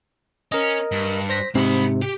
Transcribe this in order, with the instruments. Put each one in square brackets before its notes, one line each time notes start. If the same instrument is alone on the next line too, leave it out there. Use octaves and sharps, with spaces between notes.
[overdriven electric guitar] C#4 [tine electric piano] A#4 D#5
[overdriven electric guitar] G2
[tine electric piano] C5 A#6 B6
[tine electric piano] G#2 C3 [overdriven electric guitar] C4 B5
[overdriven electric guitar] G4